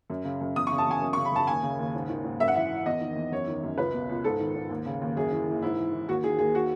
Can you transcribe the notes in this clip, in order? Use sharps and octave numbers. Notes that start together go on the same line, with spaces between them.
F#2
C#3
F#2
E2 D#6
C#6
C#3
A5
E2 G#5
F#2
C#6
C#3
B5
F#2 A5
D#2 G#5
C#3
D#2
G#2
D#3
G#2
F#2 E5
F#5
E3 E5
E3
E2 D#5
D#3
E2
F#2 C#5
D#3
F#2
C#2 B4
B2
C#2
G#2 A4
D#3
G#2
D#2
C#3
D#2
F#2 G#4
E3
E3
G#2 E4
E3
E3
D#2 F#4
D#3 G#4
D#2 G#4
F#4